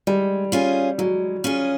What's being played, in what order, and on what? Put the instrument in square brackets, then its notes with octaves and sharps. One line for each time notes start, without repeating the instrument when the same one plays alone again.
[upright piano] G3 [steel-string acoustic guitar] G#3
[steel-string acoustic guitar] C#4 F4 G#4
[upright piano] F#3 [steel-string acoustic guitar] G#3
[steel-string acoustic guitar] C#4 F4 G#4